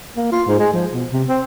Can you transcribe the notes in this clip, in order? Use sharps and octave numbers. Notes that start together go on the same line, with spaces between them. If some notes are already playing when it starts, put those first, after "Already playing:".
A#3
F4
G#2
G#3
F3
B2
C3
C4